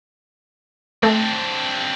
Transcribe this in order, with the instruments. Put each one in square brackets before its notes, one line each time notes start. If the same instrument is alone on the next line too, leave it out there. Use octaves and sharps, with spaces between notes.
[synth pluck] A3 [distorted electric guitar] C4 D4